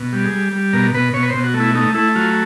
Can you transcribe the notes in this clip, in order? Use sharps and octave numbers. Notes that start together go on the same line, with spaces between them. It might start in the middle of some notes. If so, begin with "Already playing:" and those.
Already playing: B2
G3
G#4
G3
G3
B2 A#4
B2 B4
B2 C#5
B4
C5
B2
F#4
A3
E4
A3 D#4
A3 E4
F#3 F4